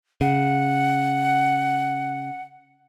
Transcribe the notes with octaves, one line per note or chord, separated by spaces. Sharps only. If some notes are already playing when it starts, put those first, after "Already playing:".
C#3 F#5